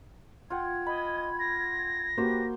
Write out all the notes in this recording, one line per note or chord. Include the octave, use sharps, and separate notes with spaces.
F4 F#5 G5 G#6
D#5 B5
A#6
A#3 F#4 G4 B4 C5